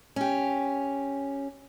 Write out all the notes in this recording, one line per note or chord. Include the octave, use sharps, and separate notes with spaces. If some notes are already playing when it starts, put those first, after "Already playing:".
C#4 G4